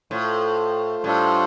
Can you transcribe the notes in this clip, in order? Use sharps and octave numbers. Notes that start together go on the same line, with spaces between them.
A2 A3 F4 C5
A2 G3 D4 F4 A4 C5